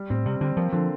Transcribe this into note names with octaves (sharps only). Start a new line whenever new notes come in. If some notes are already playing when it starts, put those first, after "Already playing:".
Already playing: G3
A2 C4
C3 G3
D3 C4
F3 A#3
D3 F3